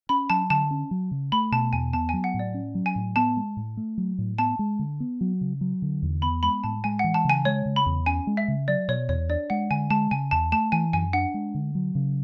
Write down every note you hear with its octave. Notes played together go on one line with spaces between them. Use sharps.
C#4 B5
F#3 A5
D3 A5
C#4
F#3
C#3
A3 B5
B2 A5
E2 G#5
B3 A5
F#3 G#5
F#5
A2
D5
C#4
F#3
G#5
A2
B3 A5
G#3
A2
A3
F#3
A2
B3 A5
G#3
D3
B3
F#3
C#3
F#3
D3
E2
B3 B5
G#3 B5
A2 A5
G#3 G#5
E3 F#5
A5
C#3 G#5
G#3 C#5
C#3
B5
E2
C#4 G#5
G#3
E5
C#3
F#3 D5
B2 C#5
E2 C#5
D4 D5
G#3 F#5
D3 G#5
G#3 A5
C#3 G#5
E2 A5
A3 A5
E3 G#5
F#2 G#5
D4 F#5
G#3
D3
F#3
C#3